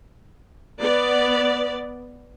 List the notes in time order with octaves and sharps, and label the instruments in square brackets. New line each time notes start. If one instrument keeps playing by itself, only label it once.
[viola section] B3 D5